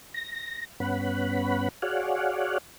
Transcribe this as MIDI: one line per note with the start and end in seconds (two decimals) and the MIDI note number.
0.14 0.65 94
0.80 1.69 43
0.80 1.69 59
0.80 1.69 61
0.80 1.69 78
0.80 1.69 83
1.82 2.58 66
1.82 2.58 68
1.82 2.58 73
1.82 2.58 74
1.82 2.58 77
1.82 2.58 78